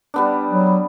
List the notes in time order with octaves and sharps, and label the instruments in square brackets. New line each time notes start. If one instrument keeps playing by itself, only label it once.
[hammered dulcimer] G3 B3 D4
[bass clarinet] F#3